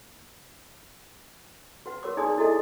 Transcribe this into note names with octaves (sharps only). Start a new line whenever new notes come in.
F#4 B4 F#5
F#4 A#4 C#5 D6
D#4 G#4 D5 G#5 C6 D#6
E4 F#4 A4 D#5 E5